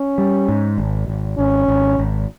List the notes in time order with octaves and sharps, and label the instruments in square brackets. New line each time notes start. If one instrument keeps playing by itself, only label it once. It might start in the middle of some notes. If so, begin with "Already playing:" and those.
Already playing: [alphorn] C#4
[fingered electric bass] G3
G#2
G#1
G#1
[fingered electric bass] G#1 [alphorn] C#4
[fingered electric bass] G#1
G#1